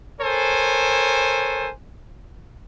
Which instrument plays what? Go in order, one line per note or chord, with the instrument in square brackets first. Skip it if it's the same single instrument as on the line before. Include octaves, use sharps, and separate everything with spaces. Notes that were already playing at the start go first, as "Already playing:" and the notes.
[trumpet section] A4 A#4 C5 C#5 G#5